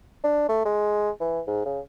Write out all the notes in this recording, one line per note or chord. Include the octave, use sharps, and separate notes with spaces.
D4
A3
G#3
E3
G#2
C#3